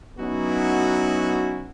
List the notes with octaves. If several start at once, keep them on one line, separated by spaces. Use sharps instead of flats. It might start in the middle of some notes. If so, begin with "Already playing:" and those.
F#3 B3 C#4 D#4 E4 F#4